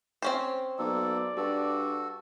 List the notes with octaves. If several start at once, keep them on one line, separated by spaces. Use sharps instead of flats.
C4 C#4 C5
B1 A#3 A4 D5
G2 F#4 A4